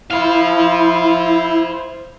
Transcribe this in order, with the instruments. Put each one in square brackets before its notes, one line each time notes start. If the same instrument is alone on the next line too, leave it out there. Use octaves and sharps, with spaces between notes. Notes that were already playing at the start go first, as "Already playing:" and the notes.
[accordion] E4 [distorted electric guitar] C5 F5